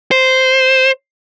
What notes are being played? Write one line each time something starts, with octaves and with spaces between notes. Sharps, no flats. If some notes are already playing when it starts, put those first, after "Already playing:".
C5